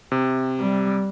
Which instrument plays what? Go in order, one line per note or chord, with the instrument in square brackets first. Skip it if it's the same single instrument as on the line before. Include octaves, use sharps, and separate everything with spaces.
[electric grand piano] C3
[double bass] G3